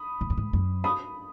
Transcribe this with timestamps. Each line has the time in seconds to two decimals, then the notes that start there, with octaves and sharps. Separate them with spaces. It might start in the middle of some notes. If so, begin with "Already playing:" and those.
Already playing: B5 D#6
0.21 G#2
0.30 F#2
0.37 G#2
0.53 F#2
0.84 B5 D#6